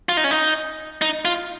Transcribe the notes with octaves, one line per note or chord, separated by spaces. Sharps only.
F4
D#4
C#4
D#4
D#4
F4